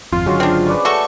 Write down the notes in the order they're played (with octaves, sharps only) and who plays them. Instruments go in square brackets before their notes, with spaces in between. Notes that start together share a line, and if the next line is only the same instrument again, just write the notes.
[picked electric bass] G#1 F2 [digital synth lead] F4
[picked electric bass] G#1 D3 F#3 [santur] G#3 C#4 F#4
[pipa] C4 D4
[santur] B4 D5 C#6
[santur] A3 [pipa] F#4 A4 [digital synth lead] C#6